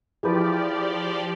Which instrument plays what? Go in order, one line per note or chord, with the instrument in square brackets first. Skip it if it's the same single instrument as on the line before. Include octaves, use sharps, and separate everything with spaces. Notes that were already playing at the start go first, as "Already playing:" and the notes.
[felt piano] E3 B4 [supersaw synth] F3 G4 D5 [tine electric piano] G#4 B5